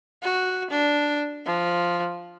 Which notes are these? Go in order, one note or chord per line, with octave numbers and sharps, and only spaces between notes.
F#4
D4
F3